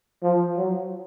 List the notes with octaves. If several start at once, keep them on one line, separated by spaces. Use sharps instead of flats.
F3
F#3